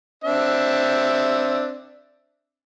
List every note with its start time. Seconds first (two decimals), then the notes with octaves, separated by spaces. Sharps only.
0.24 C4 D4 E5